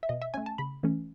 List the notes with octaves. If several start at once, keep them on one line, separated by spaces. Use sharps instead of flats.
E5
B2 D#5
E5
A3 C#4 G#5
A5
C#3 B5
E3 A3 C#4